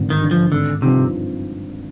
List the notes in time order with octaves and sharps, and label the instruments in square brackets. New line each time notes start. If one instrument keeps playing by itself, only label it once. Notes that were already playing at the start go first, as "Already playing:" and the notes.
Already playing: [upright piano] G#1 G2 D3
[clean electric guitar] D#3
[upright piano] G2 D3
[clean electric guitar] F3
[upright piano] G#1 [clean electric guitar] D3
[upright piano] G2 F3 C4 D#4 [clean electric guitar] C3